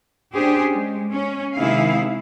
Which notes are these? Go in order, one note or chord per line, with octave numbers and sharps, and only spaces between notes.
C#4 D4 G4 G#4 C5
G#3
C#4
C3 D#3 G#3 E4 G#4 F5